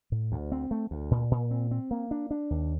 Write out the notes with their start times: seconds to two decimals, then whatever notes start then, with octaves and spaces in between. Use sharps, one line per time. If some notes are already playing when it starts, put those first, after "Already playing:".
0.12 A2
0.32 D2
0.52 C4
0.71 A3
0.91 D2
1.11 A#2
1.31 A#2
1.51 C4
1.71 C4
1.91 A#3
2.11 D4
2.31 D4
2.50 D#2